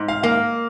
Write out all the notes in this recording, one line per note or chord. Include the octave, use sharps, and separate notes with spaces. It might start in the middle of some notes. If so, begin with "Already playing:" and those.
Already playing: G#2
F5
A#3 F5